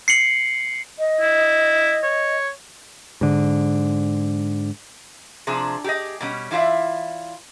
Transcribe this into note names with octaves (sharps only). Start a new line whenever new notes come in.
C7 C#7 F#7
D#5
E4
C#5
G#2 D3
C3 F3 D4 G#4
G4 G#4 D#5
B2 G3 C#4
E3 E4 F4 D5 E5